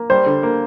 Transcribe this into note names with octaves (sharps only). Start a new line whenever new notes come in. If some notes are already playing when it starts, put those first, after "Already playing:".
Already playing: A#3
G3 C5
D3
A#3